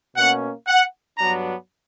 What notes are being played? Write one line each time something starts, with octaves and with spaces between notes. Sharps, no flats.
B2 A#3 C#4 F#5
F#5
G2 F#3 B3 D4 A#5